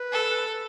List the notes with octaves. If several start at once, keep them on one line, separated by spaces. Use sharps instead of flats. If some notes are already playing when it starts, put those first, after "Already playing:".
Already playing: B4
A4